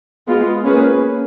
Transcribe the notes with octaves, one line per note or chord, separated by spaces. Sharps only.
G#3 B3 F4
A#3 C#4 G#4 B4